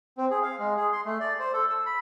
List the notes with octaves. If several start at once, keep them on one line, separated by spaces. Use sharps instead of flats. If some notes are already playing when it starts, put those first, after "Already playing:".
C4
G#4
F5
G#3
G#4
C6
A3
D5
C5
A4
E6
B5